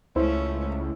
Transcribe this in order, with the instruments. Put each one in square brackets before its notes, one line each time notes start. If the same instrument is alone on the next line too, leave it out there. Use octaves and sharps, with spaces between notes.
[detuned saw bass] C#2 [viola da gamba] A3 C#4 [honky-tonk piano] E4 [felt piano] C5